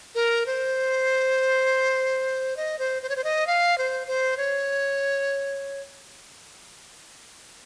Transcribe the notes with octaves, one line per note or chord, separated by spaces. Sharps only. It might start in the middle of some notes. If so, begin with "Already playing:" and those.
A#4
C5
D#5
C5
C5
C#5
C5
D#5
F5
C5
C5
C#5